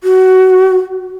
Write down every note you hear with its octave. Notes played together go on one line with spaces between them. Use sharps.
F#4